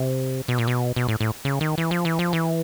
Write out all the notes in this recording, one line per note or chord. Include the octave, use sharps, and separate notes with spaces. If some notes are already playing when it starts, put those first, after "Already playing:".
Already playing: C3
B2
A#2
B2
B2
A2
A2
C#3
D#3
E3
F3
E3
F3
E3